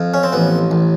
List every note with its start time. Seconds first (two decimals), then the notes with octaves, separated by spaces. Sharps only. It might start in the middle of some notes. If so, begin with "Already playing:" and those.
Already playing: F2
0.14 C#4
0.23 C4
0.33 A1 B3
0.71 A1